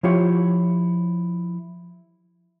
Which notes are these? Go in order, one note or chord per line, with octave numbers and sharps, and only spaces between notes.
F3 E4 F4 G4 C#5